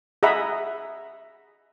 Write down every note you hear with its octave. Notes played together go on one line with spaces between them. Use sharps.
G#4 D#5 E5 F#5 A#5 B5